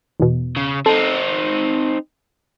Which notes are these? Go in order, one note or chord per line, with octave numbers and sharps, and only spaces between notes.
E2 B2
C#3
C4 D#4 A4